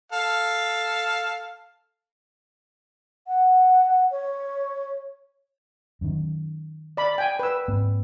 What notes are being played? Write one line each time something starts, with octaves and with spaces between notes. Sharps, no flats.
A4 F5
F#5
C#5
F#2 D#3
D5 B5
G5 G#5
B4 E6
G#2 A#3 C4